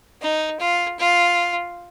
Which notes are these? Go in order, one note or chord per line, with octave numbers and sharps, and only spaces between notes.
D#4
F4
F4